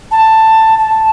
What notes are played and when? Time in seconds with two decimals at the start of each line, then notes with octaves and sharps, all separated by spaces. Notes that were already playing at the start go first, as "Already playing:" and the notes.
0.11 A5
0.78 A5